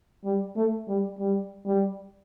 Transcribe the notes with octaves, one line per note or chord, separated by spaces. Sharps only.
G3
A3
G3
G3
G3